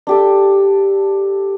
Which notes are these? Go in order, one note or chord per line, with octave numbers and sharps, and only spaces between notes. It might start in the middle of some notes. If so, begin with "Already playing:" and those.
D4 G4 A4